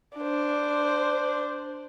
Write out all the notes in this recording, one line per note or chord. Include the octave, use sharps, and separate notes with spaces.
D4 C5